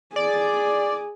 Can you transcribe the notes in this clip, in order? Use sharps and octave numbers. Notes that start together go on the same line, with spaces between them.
G#4 D5